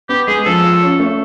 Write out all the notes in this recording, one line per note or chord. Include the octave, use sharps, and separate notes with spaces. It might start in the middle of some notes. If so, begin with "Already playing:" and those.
B3 G4
G#3 G#4
F3 A4
F4
C#4
A3